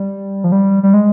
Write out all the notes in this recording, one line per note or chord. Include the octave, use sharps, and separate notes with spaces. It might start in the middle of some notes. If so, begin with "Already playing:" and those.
Already playing: G3
F3
G3
G3
G#3